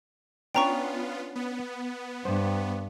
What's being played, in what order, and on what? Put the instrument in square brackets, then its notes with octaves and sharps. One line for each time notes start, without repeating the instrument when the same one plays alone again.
[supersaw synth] B3 F4 [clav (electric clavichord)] C#4 D4 [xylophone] G5 A#5 C#6
[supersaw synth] B3
[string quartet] G2 [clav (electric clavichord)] C5